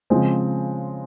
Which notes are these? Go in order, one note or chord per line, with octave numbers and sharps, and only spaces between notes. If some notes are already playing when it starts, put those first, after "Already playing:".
C#3 F3 G#3 C4